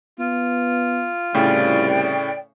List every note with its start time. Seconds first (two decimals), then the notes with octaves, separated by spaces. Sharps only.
0.19 B3 F4
1.34 C2 A2 C#3 D5 G5